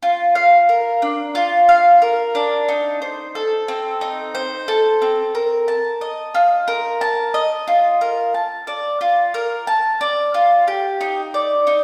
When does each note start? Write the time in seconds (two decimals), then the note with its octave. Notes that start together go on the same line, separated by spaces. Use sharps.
0.03 F4
0.35 F5
0.69 A#4
1.02 D4
1.35 F4
1.69 F5
2.02 A#4
2.35 D4
2.68 D#4
3.02 C5
3.35 A4
3.68 C4
4.01 D#4
4.35 C5
4.68 A4
5.02 C4
5.35 A#4
5.68 A5
6.01 D#5
6.34 F4
6.68 A#4
7.01 A5
7.34 D#5
7.67 F4
8.01 A#4
8.34 A5
8.67 D5
9.01 F4
9.34 A#4
9.67 A5
10.01 D5
10.34 F4
10.68 G4
11.01 D#4
11.34 D5
11.67 D#4